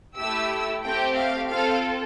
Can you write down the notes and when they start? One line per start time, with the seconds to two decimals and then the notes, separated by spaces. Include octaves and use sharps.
0.17 A3 E4 G4 E6
0.83 A3 C4 G4 G5
1.17 F5
1.50 C4 F4 A4 F5